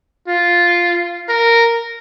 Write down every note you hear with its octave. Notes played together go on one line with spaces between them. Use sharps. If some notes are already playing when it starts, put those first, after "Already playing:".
F4
A#4